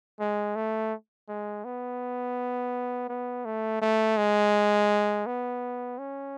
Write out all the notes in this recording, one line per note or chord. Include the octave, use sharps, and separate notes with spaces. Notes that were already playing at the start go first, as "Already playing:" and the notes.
G#3
A3
G#3
B3
B3
A3
A3
G#3
B3
C#4